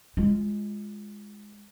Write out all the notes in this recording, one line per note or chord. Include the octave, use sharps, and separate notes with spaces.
G#3 F4